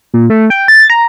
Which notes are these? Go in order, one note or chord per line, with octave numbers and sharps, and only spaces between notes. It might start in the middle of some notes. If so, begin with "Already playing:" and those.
A#2
A3
G5
A6
A#5